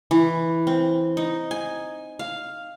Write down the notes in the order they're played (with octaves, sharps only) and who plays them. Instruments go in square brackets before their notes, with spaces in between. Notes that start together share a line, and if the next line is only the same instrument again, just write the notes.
[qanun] E3
C4
D#4
G#5
F5